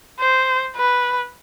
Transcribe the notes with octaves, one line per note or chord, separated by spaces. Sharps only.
C5
B4